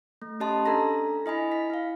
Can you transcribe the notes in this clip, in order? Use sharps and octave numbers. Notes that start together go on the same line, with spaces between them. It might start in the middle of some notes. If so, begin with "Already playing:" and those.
A3
C#4 G4 D#5 A5 B5 C6
D4 A4 A#5 A#6
E4 D#5 G#5 B5 B6
B6
E4 F5